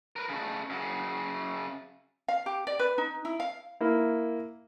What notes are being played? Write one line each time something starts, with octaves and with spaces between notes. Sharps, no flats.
A#4 B4
C#3 A3
F#2 C#3
F5
G4
D5
B4
D#4
E4
F5
A#3 E4